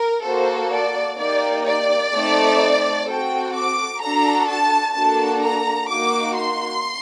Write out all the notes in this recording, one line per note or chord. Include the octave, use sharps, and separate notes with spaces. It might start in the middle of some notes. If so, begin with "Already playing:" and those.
Already playing: A#4
A#3 F#4 A4 C5
D5
A#3 D#4 G4 D5
D5
A3 C4 D#4
C4 F#4 A4 G5
D6
D4 F#4 A4 A#5
A5
A#3 D4 F#4 A4 A5
A#5
A#3 D#4 F#4 D6
C6